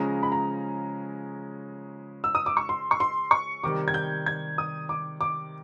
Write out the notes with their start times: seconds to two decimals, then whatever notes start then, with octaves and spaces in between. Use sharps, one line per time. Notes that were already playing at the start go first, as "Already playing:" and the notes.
Already playing: C#3 F3 G#3 C#4 A#5
0.23 B5
0.32 A#5
2.24 E6
2.35 D#6
2.46 D6
2.57 C#6
2.69 C6
2.91 C#6
3.00 C6
3.31 C#6
3.63 C3 D#3 G3 D6
3.88 G#6
3.94 G6
4.26 G#6
4.58 D#6
4.89 D6
5.21 D6